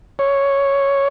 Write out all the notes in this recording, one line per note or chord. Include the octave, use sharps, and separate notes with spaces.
C#5